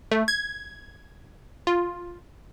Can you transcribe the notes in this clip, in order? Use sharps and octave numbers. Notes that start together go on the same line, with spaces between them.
A3
G#6
F4